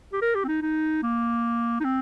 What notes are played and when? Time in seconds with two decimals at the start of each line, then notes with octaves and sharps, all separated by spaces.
0.13 G4
0.22 A#4
0.35 G4
0.44 C4
0.48 D#4
0.62 D#4
1.03 A#3
1.80 D#4
1.84 C4